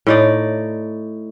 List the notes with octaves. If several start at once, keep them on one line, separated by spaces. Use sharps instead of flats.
A2 D#4 D5